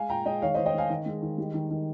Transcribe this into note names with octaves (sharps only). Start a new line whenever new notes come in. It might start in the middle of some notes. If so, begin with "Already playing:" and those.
Already playing: G#3 F5 G#5
A#2 G5 A#5
G#3 D#5 G5
D#3 C#5 F5
D#3 C5 D#5
D#5 G5
D#3 F5 G#5
D#3
G#3
D#3
G3
D#3
D#3